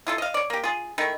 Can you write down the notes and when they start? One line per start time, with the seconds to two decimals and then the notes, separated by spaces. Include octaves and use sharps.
0.07 E4 F4 A4
0.18 D#5 F5
0.34 C#5 D5
0.50 A#3 G4
0.64 F4 G#4
0.98 D#3 A3 E4